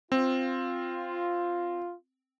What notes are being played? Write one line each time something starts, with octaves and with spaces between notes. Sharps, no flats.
C4 F4